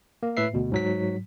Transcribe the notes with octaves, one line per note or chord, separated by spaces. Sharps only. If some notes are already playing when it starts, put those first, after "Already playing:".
A#3
A2 B4 E5 C7
D2 B2
G#2 F#3 B6